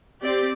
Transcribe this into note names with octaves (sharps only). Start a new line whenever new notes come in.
C4 G4 D5